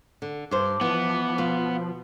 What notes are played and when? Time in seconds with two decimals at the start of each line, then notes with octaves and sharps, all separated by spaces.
0.22 D3
0.51 G2 C5 D6
0.81 E3 F3 B3
1.38 B2 F4